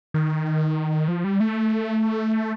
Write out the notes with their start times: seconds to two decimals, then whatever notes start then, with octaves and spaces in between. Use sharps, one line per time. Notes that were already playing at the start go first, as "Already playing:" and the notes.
0.14 D#3
1.08 F3
1.24 G3
1.40 A3